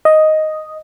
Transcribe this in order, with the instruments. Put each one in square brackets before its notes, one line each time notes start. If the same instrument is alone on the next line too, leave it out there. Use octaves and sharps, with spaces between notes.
[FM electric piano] D#5